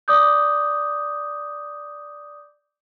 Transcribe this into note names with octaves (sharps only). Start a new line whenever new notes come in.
D5 D6 D#6 G6